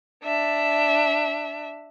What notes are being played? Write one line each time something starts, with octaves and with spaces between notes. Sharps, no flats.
D4 E5